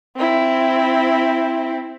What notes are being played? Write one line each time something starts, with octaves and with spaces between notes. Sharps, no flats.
C4 E4